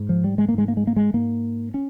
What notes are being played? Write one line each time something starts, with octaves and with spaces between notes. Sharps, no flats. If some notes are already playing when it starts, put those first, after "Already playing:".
Already playing: G#2
F3
G3
G#3
A#3
G#2 G#3
A#3
G#3
A#3
G#3
G#2 A#3
C#4